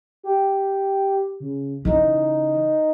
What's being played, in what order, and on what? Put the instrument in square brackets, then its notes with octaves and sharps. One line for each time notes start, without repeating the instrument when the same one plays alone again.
[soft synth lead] G4
C#3
[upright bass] C#3 E3 [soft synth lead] D#4